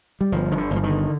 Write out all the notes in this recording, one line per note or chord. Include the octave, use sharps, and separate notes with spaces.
G3
G1 F3
G2 D#3
D3
G1
F3
D#3
D3